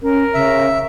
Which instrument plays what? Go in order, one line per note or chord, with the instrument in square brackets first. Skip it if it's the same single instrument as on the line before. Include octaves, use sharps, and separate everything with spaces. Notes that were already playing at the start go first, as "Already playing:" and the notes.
[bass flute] C#4 [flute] A#4
[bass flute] C#3 [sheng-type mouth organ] E5